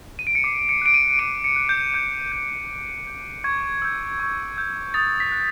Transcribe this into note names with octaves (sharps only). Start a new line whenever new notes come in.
D#7
D7
C#7
D6 C7
C#7
F#6 D7
D#7
D6 D7
C#7
F#6
G6
D6 G6
G6
D6
G6
C#6 G#6
E6 G6
C#6
E6 G6
D#6 A6
B6
F#6